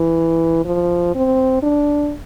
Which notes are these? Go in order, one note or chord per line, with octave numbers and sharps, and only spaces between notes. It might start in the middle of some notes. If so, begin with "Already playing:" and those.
Already playing: E3
F3
C4
D4